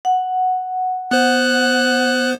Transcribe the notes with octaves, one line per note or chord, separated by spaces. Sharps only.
F#5
B3 C5 F#6